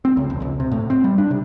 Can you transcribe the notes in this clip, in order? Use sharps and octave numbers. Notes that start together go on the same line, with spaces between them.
C4
C#2
E1
C#2
C3
A2
C4
G3
D4
C3